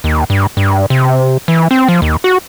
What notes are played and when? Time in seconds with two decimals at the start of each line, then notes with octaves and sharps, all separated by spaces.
0.04 D#2
0.30 G2
0.57 G2
0.90 C3
1.48 E3
1.71 C4
1.88 F3
2.02 D#2
2.24 F#4